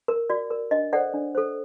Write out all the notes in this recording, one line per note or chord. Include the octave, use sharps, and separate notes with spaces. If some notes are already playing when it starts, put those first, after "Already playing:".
A#4
F#4 D5
A#4
D4 D#5
A4 C5 D5 F#5
D4
A4 C5